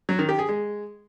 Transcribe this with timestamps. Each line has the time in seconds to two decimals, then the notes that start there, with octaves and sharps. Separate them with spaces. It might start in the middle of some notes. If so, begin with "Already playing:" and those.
0.09 F#3
0.19 D#3
0.29 G4
0.39 G#4
0.49 G#3